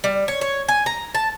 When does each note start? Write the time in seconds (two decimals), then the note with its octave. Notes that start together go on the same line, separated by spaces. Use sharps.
0.04 G3
0.28 C#5
0.41 C#5
0.69 G#5
0.86 A#5
1.15 A5